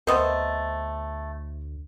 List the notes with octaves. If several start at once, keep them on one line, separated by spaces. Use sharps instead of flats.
D2 A3 B3 C4 A#4 C5 D#5